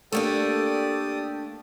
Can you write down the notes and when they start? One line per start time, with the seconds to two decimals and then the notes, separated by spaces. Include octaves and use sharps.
0.12 A3 A#3 D4 G4 A4 D5 D#6